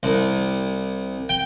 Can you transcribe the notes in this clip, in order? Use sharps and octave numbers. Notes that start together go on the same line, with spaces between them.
C2
G5